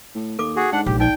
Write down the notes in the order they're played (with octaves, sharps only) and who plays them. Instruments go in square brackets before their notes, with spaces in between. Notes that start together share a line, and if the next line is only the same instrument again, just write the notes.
[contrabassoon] A2
[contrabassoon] D#2 [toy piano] A4 D6
[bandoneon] F#4 G#4
[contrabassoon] G#2 [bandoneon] D4 F#5
[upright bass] A#1 [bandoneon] G4
[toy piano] D#4 D5 [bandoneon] G5